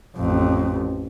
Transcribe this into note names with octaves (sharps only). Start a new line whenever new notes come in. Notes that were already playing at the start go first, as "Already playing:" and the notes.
A1 F2